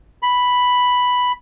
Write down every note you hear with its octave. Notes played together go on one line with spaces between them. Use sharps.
B5